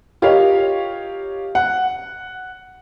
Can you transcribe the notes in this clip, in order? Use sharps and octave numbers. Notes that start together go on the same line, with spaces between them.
F4 G4 A#4 C#5 D#5 F5
F#5